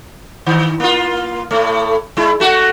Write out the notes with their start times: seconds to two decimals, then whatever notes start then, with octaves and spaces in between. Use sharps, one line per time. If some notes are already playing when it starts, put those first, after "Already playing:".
0.46 D#3
0.80 A#3 F4
1.51 A2 A3
2.17 G#3 E4
2.40 A3 F#4